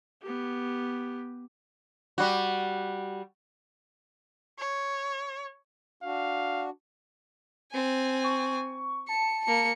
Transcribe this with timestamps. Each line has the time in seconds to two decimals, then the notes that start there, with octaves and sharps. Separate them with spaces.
0.22 B3 G4
2.18 G3 F#4
4.59 C#5
6.03 D4 F#4 F5
7.73 C4 G#5
8.24 C#6
9.09 A5 C#7
9.45 A#3 C#7